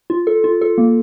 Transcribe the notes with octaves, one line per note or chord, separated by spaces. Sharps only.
F4
A4
F4
A4
A#3